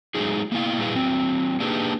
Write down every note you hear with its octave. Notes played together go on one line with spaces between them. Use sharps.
F#3 G#3 A3 D#4 G#4
A#3 B3 E4 F5
A#2 G3 E4 G#4 B4 F5
F#3 C4
A#3 D4 D#4 G4 G#4 B4